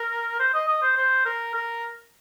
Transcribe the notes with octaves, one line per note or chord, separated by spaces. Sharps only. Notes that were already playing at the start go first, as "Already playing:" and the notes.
Already playing: A#4
C5
D#5
D#5
C5
C5
A#4
A#4